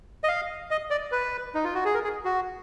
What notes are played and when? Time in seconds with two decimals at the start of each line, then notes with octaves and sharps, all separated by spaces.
0.24 D#5
0.28 F5
0.71 D#5
0.90 D5
1.12 B4
1.55 D#4
1.64 F4
1.74 F#4
1.85 G#4
1.94 A#4
2.04 G#4
2.25 F#4